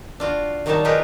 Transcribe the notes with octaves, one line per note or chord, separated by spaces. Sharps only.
D4 F4 F#4
D#3 F#3 G3 D#4 C#5 A5
D#4 F4 G4 G#4 A#4 B4